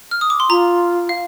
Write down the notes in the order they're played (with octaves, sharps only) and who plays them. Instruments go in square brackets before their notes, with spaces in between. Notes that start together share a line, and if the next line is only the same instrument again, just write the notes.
[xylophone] F6
D#6
D6
C6
[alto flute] F4 [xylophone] A#5
[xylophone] F5